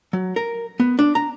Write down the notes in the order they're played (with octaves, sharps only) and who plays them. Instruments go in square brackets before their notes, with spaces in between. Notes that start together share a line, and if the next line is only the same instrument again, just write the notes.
[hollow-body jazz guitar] F#3
A#4
B3
D4
A#5